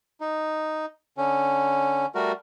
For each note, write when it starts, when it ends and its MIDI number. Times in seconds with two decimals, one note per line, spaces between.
0.21 0.86 63
1.18 2.06 50
1.18 2.06 61
2.15 2.32 55
2.15 2.32 57
2.15 2.32 66
2.15 2.32 70